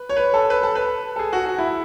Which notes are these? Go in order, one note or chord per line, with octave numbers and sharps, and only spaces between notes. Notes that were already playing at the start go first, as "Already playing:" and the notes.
Already playing: B4
C#5
B4
A4
B4
A4
B4
A4
G#4
F#4
F#4
E4